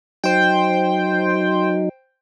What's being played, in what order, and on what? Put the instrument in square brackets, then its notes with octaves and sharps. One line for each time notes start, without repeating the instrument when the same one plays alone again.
[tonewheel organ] F#3 D#4 [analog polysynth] C5 G5